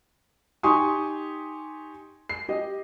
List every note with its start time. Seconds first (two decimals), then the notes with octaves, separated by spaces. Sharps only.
0.63 D#4 G4 G#5 C6 C#6 D#6
2.29 C7
2.49 G4 D#5